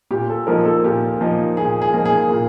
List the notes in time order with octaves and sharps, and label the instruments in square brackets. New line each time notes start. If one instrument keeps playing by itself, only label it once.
[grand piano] A#2 [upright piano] G4
[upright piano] A4
[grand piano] F3 A#3 D#4 [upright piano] A#4
[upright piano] A4
[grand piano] A#2 [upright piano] G4
[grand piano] F3 A#3 D#4
[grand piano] A#2 [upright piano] G#4
[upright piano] G#4
[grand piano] F3 A#3 D#4
[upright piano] G#4
[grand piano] A#2